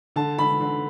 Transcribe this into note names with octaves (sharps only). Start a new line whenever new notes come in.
D3 A5
D3 B5
D3